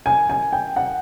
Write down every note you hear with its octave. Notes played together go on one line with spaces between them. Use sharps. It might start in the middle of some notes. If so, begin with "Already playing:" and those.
G#5
G#5
G5
F#5